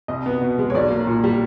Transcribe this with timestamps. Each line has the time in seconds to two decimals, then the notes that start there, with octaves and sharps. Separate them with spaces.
0.08 C2 D#5
0.26 B3
0.41 B2
0.59 G#3
0.70 C#5
0.75 B1 D5
0.91 A#3
1.07 A#2
1.24 G3